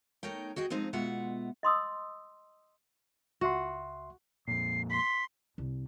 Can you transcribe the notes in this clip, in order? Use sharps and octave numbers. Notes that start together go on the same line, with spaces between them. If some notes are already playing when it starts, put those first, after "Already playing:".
A3 D#4 A#4 C#5 G5
F#4 G#4 D#5 G5
F3 G#3 C4 D#4 D#5
B2 G#3 F4 E5 F#5
D#5 C6 D#6 E6
C#2 F#4 E5 C6
F2 A#2 C7
C6 B6
C2